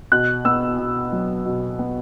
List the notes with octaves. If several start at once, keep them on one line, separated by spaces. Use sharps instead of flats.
B2 F#6
B3 E6
B2
F#3
B2
B3